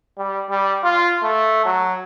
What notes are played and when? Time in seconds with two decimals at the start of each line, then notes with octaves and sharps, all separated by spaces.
0.18 G3
0.50 G3
0.84 F4
1.23 A3
1.66 F#3